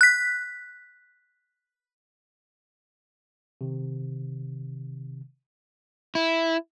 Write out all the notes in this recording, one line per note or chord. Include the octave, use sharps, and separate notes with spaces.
F#6 B6
C3 D#3
E4